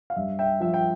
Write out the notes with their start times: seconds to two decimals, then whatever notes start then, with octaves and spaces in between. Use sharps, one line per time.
0.10 F5
0.16 G2 E5
0.39 E5 G5
0.60 F3 E5
0.74 G5